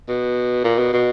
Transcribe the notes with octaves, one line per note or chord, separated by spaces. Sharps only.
B2
A#2
B2
B2